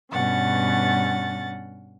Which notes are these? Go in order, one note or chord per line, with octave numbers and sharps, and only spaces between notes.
G2 B2 C#4 F#5 A6